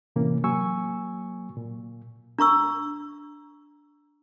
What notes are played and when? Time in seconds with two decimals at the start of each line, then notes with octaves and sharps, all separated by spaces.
0.16 A2 C3 E3 A#3 C#4
0.44 F#3 A#3 G#5 C#6 E6
1.57 A#2
2.39 D4 A#5 C#6 E6